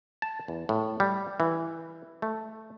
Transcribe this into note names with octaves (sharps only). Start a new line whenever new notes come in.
A5
E2
A2
G3
E3
A3